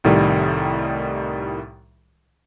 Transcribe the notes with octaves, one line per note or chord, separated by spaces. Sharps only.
C2 A2 D#3 G3